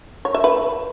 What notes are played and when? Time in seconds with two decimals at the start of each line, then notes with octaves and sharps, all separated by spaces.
0.25 C#5
0.34 E5
0.44 B4